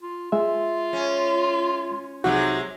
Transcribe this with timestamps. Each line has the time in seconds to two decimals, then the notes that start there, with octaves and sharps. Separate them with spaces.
0.03 F4
0.32 G#3 F4 E5
0.93 C#4
2.24 C2 C3 F#3 G#3 D#4 F#4